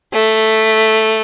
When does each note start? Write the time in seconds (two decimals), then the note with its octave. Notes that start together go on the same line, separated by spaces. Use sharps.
0.13 A3